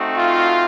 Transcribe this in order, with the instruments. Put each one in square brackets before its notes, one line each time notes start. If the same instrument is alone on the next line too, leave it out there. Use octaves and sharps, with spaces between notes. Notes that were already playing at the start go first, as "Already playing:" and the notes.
Already playing: [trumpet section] A3 C4 D#4 F#4
F4 F5